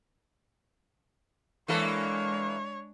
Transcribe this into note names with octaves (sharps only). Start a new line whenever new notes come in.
E3 G#3 A#3 D4 A4 C#5